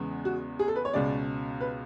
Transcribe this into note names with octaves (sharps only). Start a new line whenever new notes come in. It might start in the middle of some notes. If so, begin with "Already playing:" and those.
Already playing: E2 C#3 G#3 B3
F#4
G#4
A4
B4
C#5
C#2 B2 G#3 C#4 D5
B4